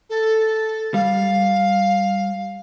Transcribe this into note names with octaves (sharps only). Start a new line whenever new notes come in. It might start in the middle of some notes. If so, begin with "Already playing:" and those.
A4
G3 F5